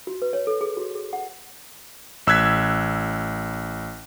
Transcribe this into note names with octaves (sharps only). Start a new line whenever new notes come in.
F#4
B4
C#5
A4
G#4
F#4
G#4
F#5
A1 E6 F#6 G#6 B6